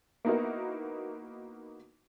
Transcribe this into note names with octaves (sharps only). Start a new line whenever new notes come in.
A#3 B3 D#4 E4 F#4 A#4